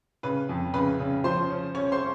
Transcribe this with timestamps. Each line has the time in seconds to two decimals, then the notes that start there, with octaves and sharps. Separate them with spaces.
0.23 C#3 B4 B5
0.49 F2
0.74 C#3 B4 B5
0.99 C#3
1.24 F3 C5 C6
1.50 C#4
1.75 C#4 C#5 C#6
1.92 C5 C6